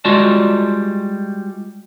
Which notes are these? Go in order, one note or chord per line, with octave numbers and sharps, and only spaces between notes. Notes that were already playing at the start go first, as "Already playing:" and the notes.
G3 G#3 F4 F#4 D5 A5